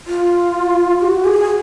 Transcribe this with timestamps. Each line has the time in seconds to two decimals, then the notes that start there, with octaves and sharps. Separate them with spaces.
0.07 F4
1.01 G4
1.06 F#4
1.25 G#4